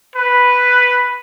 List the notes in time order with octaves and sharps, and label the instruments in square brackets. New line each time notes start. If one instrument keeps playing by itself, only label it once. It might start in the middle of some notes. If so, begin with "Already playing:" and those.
[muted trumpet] B4